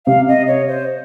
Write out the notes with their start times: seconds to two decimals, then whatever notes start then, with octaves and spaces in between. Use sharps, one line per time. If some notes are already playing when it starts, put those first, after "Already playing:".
0.06 C3 F5
0.28 D#5
0.48 C#5
0.68 C5